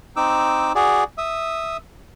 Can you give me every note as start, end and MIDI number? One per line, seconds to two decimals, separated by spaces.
0.16 0.72 60
0.16 0.72 63
0.16 0.72 86
0.16 0.72 88
0.75 1.04 66
0.75 1.04 68
0.75 1.04 74
1.18 1.77 76
1.18 1.77 87